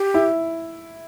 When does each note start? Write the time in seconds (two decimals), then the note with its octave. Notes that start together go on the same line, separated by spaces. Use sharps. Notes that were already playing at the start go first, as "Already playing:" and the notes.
Already playing: G4
0.14 E4